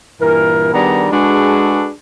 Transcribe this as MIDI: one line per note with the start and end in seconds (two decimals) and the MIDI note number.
0.20 0.72 43
0.20 0.72 46
0.20 0.72 52
0.20 0.72 70
0.73 1.06 51
0.73 1.06 55
0.73 1.06 59
0.73 1.06 62
0.73 1.06 68
0.73 1.06 82
1.12 1.90 56
1.12 1.90 62
1.12 1.90 66
1.12 1.90 68
1.12 1.90 69
1.12 1.90 71